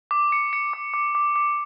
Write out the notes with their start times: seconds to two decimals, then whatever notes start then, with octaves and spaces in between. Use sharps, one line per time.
0.11 D6
0.32 C#7
0.53 C#7
0.73 D6
0.94 D6
1.15 D6
1.36 D6